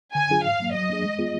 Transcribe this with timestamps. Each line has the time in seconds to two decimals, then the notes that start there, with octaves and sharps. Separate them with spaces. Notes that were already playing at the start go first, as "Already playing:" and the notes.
0.15 D3 G#5
0.30 F#3 D4 F4 G#4
0.44 G#2 F5
0.60 F#3 A#3
0.74 F#3 D#5
0.90 A#3 D4 G#4
1.04 G#3
1.19 B3 F4 G#4